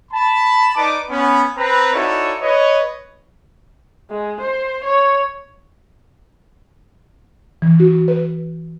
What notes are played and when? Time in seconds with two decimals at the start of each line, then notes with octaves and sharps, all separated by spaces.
0.12 A5 B5
0.75 D#4 B4 D5 D6
1.10 B3 C#4 B5
1.57 C4 B4 A#5
1.93 D#4 E4 F#4 A4 C#5 D5
2.41 B4 C#5 D#5
4.10 G#3
4.40 C5
4.83 C#5
7.62 E3
7.80 F#4
8.08 B4